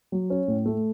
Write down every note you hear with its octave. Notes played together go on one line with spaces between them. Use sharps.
F#3
C#4
A2
A3